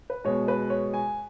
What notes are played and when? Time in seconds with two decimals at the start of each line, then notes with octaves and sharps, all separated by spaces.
0.10 B4
0.24 B2 G#3 C#5
0.48 B4
0.70 C#5
0.94 G#5